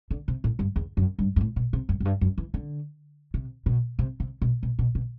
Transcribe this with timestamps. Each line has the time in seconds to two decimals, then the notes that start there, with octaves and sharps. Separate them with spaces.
0.11 D3
0.28 C3
0.44 A2
0.59 G2
0.76 E2
0.97 F#2
1.19 G2
1.36 G2
1.41 A2
1.56 B2
1.73 C3
1.89 F#2
2.00 F#2
2.05 G2
2.21 F#2
2.38 E3
2.54 D3
3.34 C3
3.66 B2
3.99 C3
4.20 C3
4.42 B2
4.63 B2
4.79 B2
4.95 B2